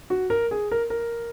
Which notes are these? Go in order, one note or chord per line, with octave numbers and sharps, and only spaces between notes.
F#4
A#4
G#4
A#4
A#4